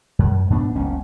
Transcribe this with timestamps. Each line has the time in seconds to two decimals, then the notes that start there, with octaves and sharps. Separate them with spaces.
0.19 F#2
0.50 G#2 B3 D4
0.75 F#1 C#2 C#4